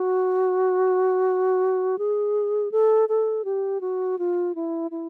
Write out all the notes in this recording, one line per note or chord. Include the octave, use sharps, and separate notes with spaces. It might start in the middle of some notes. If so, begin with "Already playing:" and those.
Already playing: F#4
G#4
A4
A4
G4
F#4
F4
E4
E4